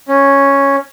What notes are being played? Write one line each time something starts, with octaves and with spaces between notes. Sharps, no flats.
C#4